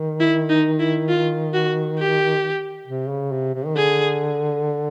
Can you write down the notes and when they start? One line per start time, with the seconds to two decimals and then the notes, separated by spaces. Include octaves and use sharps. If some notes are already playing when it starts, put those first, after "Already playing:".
Already playing: D#3
0.20 E4
0.49 D#4
0.80 E4
1.08 F4
1.54 F#4
1.99 G4
2.87 C3
3.09 C#3
3.32 C3
3.55 C3
3.66 D#3
3.77 D3 G#4